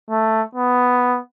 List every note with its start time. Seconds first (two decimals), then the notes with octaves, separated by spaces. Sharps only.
0.10 A3
0.55 B3